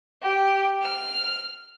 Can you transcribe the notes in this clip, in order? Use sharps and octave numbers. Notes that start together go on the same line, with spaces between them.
G4
F6